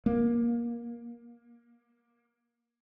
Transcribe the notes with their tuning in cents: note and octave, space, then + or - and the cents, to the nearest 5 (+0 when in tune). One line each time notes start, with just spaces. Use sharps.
A#3 +20